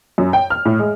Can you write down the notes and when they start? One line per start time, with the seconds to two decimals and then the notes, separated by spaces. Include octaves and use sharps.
0.18 F#2
0.33 G5
0.50 F6
0.65 A2
0.79 G#3